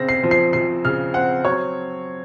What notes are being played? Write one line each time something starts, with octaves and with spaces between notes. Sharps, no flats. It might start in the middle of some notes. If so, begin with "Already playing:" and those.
Already playing: C#3 C4 A#6
C7
F3
C7
F3 C7
C#3 F6
C4 F#5
F#3 C#5